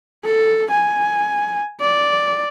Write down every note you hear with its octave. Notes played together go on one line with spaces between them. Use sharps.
A4
G#5
D5